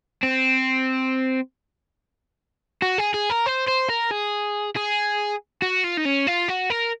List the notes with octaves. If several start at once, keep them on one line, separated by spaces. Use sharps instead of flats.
C4
F#4
G#4
G#4
A#4
C5
C5
A#4
G#4
G#4
F#4
F4
D#4
C#4
F4
F#4
A#4